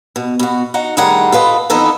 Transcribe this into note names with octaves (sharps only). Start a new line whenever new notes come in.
B2
B2 F#4
D#4 F#4 F#5
A2 D#3 G3 G#4 F#5 A#5
F4 A4 B4 D#5
F2 E3 B3 D#4 A4 D#5